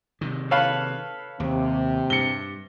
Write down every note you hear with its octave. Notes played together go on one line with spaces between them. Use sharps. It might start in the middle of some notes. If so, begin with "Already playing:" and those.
C3 D#3
A4 B4 C#5 F5
D#2 C3
G2 C#7 G7